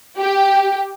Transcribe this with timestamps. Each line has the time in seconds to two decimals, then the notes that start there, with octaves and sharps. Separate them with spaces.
0.18 G4